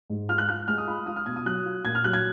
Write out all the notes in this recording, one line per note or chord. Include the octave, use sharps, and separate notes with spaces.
G#2
F4 F6
F#6
F4 F#6
G#3 F6
D#6
F4 B5
F4 D#6
F6
B2 G#6
D#6
F#3 F#6
F4
A#2 G#6
F6
F#3 F#6
G#6